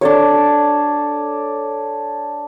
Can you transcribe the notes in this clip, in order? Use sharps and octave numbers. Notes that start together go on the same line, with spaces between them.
D4 A4 C#5